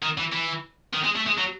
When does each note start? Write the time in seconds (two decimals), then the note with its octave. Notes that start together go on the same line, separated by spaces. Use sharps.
0.02 D#3
0.18 E3
0.32 E3
0.93 D#3
1.04 G#3
1.16 A3
1.27 G#3
1.38 F#3